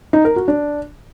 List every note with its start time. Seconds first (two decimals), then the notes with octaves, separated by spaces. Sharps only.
0.13 D#4
0.25 A#4
0.36 F#4
0.48 D4